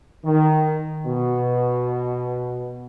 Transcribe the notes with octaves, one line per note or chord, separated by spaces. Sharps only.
D#3
B2